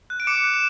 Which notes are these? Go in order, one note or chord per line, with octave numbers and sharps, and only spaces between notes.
F#6
D7
D6 C#7 E7
F#6
E7